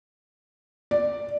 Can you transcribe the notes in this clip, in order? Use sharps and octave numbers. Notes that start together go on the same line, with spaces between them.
D5